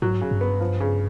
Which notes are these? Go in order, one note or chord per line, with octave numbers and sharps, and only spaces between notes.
G#2 F#3
C#3
G2
B3
F3
C#3